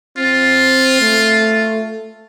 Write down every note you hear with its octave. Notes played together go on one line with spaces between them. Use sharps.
C4 F4
A3